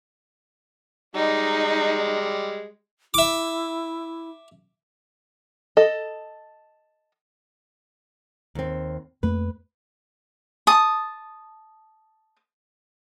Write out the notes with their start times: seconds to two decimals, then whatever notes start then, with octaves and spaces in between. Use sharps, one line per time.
1.15 G3 G#3 D#4
3.14 E4 E5 D6
5.77 A4 D#5
8.55 D#2 C4
9.23 F2 A3 A#3 B4
10.67 A5 D#6